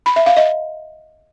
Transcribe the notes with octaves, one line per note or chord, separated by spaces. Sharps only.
B5
E5
F5
D#5